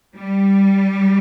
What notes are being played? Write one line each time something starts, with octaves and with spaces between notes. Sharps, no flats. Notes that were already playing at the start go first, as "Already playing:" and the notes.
G3